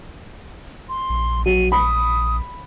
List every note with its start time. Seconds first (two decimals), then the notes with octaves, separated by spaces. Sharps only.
0.89 C6
1.10 A#1
1.46 F#3 D#7
1.72 B5 D#6